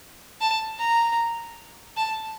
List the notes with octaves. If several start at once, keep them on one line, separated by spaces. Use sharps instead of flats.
A5
A#5
A5